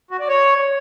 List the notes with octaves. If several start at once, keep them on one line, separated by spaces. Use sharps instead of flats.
F#4
D5
C#5